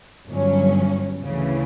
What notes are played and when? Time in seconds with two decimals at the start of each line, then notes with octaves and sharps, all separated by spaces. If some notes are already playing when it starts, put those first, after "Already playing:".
0.29 G1 G2 F#3 C#4
1.22 D2 C#3 E3